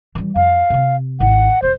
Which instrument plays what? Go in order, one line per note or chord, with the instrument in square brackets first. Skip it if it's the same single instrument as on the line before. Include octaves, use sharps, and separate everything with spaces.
[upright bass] E3 G3
[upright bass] F2 [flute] F5
[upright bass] C3 C4
[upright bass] G#1 E4 [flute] F#5
[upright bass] E1 F3 [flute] C5